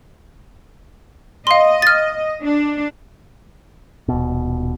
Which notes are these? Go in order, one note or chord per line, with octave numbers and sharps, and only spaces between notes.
D#5 F5 C6
F6 A6
D4
D#1 B2